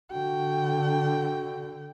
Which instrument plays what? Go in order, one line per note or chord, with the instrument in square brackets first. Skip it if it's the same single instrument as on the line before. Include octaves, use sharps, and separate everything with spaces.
[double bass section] D3 [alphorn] F#4 [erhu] G5